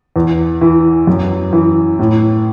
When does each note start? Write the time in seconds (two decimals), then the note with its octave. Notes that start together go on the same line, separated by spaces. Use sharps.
0.16 E2
0.61 E3
1.07 F#2
1.53 E3
1.99 A2